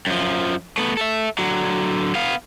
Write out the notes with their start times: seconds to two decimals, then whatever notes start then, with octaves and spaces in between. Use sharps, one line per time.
0.07 F#2 F3
0.78 A3 B3
0.97 A4 E5
1.38 D3 F#3
2.15 B3 F5